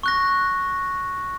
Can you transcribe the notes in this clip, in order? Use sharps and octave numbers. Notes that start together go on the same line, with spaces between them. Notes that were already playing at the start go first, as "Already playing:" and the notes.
C#6 F#6 A#6